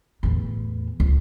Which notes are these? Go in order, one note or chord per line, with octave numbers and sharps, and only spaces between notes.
E2 A2
C#2